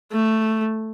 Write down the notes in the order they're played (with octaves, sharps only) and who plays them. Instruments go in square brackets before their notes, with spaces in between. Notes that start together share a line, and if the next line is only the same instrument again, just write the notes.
[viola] A3